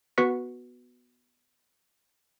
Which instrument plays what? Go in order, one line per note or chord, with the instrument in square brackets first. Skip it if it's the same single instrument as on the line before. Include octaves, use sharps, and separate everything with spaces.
[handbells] B3 F#4 B4 C#6 B6 C#7